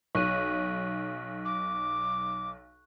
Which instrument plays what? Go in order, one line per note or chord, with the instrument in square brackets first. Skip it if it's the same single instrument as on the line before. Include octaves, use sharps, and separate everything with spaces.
[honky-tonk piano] B1 [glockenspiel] C#6 F#6 D#7
[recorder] D6